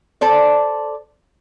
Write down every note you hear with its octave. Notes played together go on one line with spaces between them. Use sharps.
A4 C5 D5